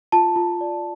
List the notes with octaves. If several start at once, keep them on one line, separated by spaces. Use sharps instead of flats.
F4 A5
F4
D5